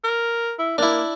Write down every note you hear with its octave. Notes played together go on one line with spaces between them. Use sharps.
A#4
E4
A#3 D4 E4